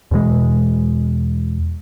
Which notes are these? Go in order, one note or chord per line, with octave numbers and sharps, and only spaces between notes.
E2 B2 E3 G#3